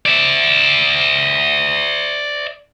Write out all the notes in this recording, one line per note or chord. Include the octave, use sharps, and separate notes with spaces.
D5 E5